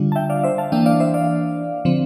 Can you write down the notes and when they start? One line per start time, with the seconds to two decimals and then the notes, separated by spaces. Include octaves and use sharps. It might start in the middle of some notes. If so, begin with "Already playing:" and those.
Already playing: D3 G3 D4 F4
0.12 A5
0.16 E5 G5
0.29 D5 F5
0.44 C5 E5
0.58 F5 A5
0.72 E3 A#3 D4 E5 G5
0.86 D5 F5
1.00 C5 E5
1.14 D5 F5
1.85 D3 F3 C4